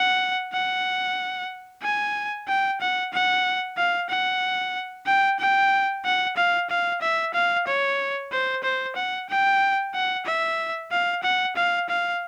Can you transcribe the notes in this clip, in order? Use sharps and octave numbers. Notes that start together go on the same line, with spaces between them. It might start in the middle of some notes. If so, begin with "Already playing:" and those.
Already playing: F#5
F#5
G#5
G5
F#5
F#5
F5
F#5
G5
G5
F#5
F5
F5
E5
F5
C#5
C5
C5
F#5
G5
F#5
E5
F5
F#5
F5
F5